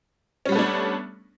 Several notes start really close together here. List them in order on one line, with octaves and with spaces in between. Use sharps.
C#4 G3 B3 A3 D4